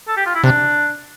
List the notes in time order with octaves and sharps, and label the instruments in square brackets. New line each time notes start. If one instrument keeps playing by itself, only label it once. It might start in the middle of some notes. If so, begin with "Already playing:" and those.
[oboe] A4
G4
F4
E4
[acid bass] C3 [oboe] D4